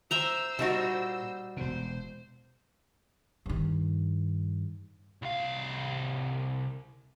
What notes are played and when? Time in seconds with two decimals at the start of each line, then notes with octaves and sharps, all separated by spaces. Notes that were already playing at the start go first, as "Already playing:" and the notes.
0.11 C5 E5 G5 A#5 E6
0.59 A#2 G3 D#4 F#4
1.57 E1 B2 C5
3.46 G2 D#3
5.22 C2 F5